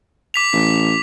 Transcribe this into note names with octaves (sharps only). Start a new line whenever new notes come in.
D6 B6 F7
A1 B6